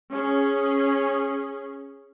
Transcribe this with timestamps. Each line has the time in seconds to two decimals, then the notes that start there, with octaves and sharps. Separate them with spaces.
0.13 C#4 G#4